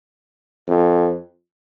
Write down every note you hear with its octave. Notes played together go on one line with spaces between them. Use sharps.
F2